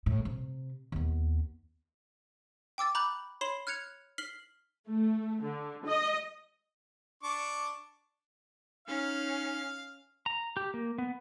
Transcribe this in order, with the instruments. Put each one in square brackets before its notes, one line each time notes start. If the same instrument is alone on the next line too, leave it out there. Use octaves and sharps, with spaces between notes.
[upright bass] A2
C3
D#2 B3
[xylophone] G5 D6 E6 A6
A#5 B5 D6 F#6 G6 F#7
C#5 B5 C6 C7 E7 G7
F6 F#6 G#6 C#7 F7
F6 B6 C7 F#7 G7
[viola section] A3
D3
D#5
[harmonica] D4 C#6 D6
[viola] C#4 [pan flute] D#4 [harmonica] F5
[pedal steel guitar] A#5
G4
A#3
B3